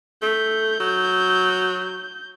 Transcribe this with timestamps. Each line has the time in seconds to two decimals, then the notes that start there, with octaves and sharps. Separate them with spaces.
0.22 A3 G6
0.80 F#3